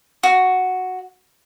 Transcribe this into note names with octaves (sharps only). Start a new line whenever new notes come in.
F#4